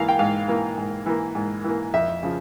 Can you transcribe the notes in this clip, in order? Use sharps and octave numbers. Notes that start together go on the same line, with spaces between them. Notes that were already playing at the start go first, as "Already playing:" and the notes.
Already playing: G#2 E3 A#3 F5
G5
G#2 F5
E3 A#3
G#2
E3 A#3
G#2
E3 A#3
F2 E5
C#3 F3